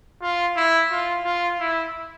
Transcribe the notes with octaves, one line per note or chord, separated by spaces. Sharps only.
F4
E4
F4
F4
E4